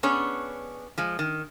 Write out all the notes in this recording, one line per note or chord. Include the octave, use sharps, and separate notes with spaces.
B3 C#4 D4 G#4 C#5
F3 G#3
D#3